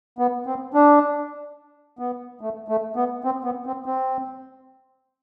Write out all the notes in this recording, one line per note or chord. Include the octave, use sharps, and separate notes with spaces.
B3
C4
D4
B3
A3
A3
B3
C4
B3
C4
C4